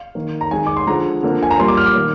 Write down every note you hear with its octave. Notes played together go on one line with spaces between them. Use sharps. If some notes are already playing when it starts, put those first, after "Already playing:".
Already playing: F5
D#3 A#3
A#5
D#3 G#3 G#5
D6
C6
D3 F3 G#3 A#5
D3 F3 A#3
G#5
A#5
A#2 G3 A#3 C6
D6
F6
D6
D#3 A#3